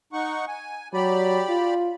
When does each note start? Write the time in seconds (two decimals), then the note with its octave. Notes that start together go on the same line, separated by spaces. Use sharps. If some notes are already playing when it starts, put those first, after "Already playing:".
0.13 D#4 F#5 C#6
0.48 G#5
0.94 F#3 G4 D5 B5
1.49 F4